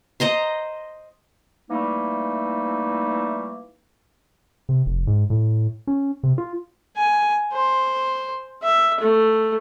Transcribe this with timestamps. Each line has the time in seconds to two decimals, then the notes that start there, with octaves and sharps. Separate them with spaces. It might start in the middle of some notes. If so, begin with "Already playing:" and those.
0.20 C5 D#5 A#5 C6
1.70 E3 G3 A3 A#3 D#4
4.69 C3
4.86 F1
5.07 G#2
5.30 A2
5.87 C#4
6.23 C3
6.38 F4
6.97 G#5
7.53 C5
8.63 E5
9.00 A3